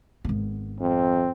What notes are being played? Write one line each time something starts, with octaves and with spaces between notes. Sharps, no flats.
G#1 B3
F2 C4